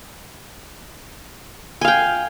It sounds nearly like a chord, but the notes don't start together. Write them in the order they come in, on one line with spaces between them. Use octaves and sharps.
G#5 F5 G5